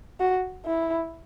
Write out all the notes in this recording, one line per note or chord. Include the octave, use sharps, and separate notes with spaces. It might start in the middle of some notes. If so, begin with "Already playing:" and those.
F#4
E4